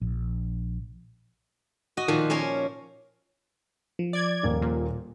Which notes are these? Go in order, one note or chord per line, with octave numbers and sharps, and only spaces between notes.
A#1
F#4 D#5
A#2 D#3 F3
C#4 A#4 C5 C#5 G#5
F3
D5 G#6
D#1 A#3
A#2